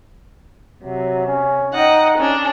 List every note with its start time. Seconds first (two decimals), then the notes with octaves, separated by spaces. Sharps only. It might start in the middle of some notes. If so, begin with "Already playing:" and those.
0.84 C3 F#3
1.27 C#4
1.74 D#4 D#5 F#5 G5
2.18 C#4 D4 G#4